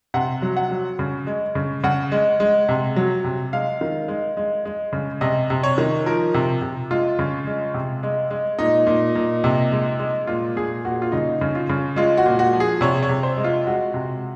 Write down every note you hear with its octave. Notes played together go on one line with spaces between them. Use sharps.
C3 F#5
F#3
F#5
F#3
C#3
G#3
C#3
C#3 F#5
G#3
G#3
C3
F#3
C3
G#3 F5
D#3
G#3
G#3
G#3
C#3
C3 D#5
C3
C#5
D#3
F3 A#4
C3
C3
G#3 F4
C#3
G#3
C3
G#3
G#3
A#2 D#4
A#2
A#2
C3
G#3
G#3
A#2 F4
A#2 G#4
A#2 F#4
F4
C#3 D#4
C#3
F4
C#3
G#3 F4
F#4
A#2
F#4
F3
G#4
C3 C#5
C#5
C3
C5
G#3
F4
G#3 F#4
C3